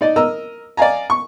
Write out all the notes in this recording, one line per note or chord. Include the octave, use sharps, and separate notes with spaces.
D#4 D5 D#5
A#4 D#5 A#5 E6
D5 D#5 F5 G#5 A#5
C#6